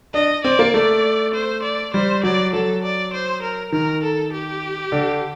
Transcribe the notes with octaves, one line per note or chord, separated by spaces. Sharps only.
D4 D#5
C4 D5
A#3
A3 D5
C5
D5
G3 C5
F#3 D5
F#3 A4
D5
C5
A#4
D#3 A#4
A4
G4
D3